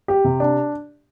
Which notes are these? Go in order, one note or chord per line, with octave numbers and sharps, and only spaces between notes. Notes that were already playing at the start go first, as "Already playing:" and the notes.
G4
C3
D4